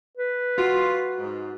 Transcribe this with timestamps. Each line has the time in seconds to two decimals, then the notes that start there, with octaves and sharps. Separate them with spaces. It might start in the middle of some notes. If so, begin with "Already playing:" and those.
0.17 B4
0.58 F4 F#4
1.19 G#2